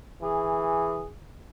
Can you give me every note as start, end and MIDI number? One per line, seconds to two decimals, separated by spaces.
0.21 1.06 52
0.21 1.10 68